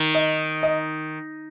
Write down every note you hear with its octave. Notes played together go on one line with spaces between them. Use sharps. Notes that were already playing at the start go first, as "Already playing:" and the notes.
Already playing: D#3
D#5
D#5